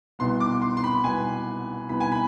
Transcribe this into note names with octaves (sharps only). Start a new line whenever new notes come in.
C2 B2 B3 C6
D6
C6
C6
B5
C2 B2 B3 G#5
C2 B2 B3 B5
G#5
B5